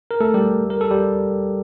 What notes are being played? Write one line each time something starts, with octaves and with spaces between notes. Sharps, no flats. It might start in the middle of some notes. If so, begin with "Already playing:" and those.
A#4
A3 A4
G3 G4
A#4
A4
G3 G4